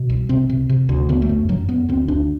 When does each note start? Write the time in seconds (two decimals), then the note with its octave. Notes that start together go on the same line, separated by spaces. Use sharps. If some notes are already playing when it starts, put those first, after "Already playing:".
Already playing: B2
0.10 C2
0.29 C3 C4
0.49 C3
0.69 C3
0.89 D2
1.09 D3 B3
1.22 A3
1.29 F#2
1.49 F#2 F#3
1.69 F#2 B3
1.89 D2 C4
2.08 D2 D4